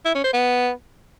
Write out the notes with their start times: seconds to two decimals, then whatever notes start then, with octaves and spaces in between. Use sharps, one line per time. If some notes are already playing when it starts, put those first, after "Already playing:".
0.05 E4
0.15 C#4
0.24 C5
0.33 B3